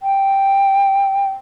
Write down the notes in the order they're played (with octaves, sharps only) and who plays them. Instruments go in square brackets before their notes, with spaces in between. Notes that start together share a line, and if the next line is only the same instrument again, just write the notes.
[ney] G5